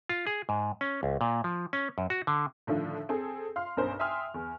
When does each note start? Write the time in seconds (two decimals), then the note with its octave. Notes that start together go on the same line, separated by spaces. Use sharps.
0.09 F4
0.27 G#4
0.49 G#2
0.81 C#4
1.03 C#2
1.21 A#2
1.44 F3
1.73 C#4
1.98 F#2
2.10 F#4
2.27 D3
2.67 A2 D3 D#3 F3
3.09 C4 G#4 A4
3.56 F4 F5 C6 F6
3.77 B1 G2 C#4 A#4 C5
4.00 E5 G5 G#5 C6 D#6 F6
4.34 E2